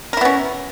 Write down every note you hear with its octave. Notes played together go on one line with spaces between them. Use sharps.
B3 C#4 E4 A#4